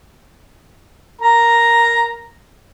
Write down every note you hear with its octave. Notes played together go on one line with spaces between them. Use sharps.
A#4 A#5